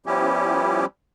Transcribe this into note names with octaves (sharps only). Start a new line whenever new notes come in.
F3 G3 B3 C#4 E4 G4